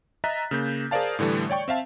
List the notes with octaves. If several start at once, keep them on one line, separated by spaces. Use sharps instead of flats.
D#5 E5 A#5 F#6 A6 B6
C#3 A#3 G6
G#4 A#4 C5 D5 F5 A5
A2 D3 E3 G3 A3
C#5 D5 G5 C#6
C4 E5 F5 A5